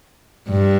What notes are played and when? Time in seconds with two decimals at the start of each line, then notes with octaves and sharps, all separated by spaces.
0.49 G2